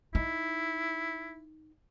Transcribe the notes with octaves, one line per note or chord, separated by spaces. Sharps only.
D#4 E4